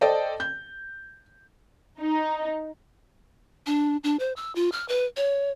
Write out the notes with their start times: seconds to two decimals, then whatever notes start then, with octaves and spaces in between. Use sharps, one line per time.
0.01 A4 C5 D5 D#5 G5 A5
0.40 G6
1.99 D#4
3.67 D4
4.04 D4
4.19 C5
4.36 E6
4.55 F4
4.72 F6
4.88 B4
5.17 C#5